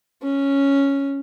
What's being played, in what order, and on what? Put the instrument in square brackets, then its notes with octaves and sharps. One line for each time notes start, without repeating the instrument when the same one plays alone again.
[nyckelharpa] C#4